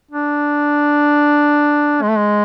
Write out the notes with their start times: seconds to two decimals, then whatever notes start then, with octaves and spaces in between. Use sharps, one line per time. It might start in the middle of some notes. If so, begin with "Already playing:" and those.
0.11 D4
2.02 G#3
2.10 A3
2.17 G#3